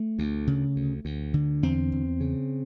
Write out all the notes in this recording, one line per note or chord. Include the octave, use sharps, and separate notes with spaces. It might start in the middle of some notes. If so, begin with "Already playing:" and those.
Already playing: A3
D2
C#3
D2
D2
D3
E2 C4
E2
C#3